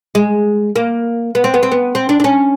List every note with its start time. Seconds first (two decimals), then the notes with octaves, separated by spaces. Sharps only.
0.15 G#3
0.76 A#3
1.35 B3
1.44 C4
1.54 B3
1.63 C4
1.72 B3
1.95 C4
2.09 D4
2.20 D4
2.24 C#4